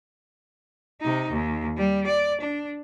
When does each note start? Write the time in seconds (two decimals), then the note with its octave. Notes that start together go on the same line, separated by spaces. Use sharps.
1.01 C3 D#4
1.31 D#2
1.77 G3
2.06 D5
2.41 D4